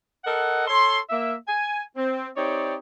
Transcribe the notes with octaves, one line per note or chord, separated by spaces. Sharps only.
A4 A#4 D#5 F#5
A4 C#5 C6
A#3 E5
G#5
C4
C4 D#4 G4 C#5 D5